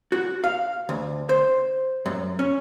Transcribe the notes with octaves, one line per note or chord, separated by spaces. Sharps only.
F#4
F5
D2
C5
F#2
C#4